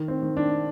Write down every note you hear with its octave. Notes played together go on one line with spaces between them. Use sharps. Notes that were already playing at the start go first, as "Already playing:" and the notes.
Already playing: D#3
C4
D#3
D4